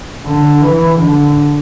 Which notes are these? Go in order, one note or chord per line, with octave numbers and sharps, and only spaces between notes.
D3
E3
D3